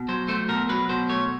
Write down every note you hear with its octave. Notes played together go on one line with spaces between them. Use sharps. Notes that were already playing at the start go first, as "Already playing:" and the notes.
Already playing: B2
F#3 C5
A3 C5
B2 A#4
F#3 B4
B2 C5
A3 C#5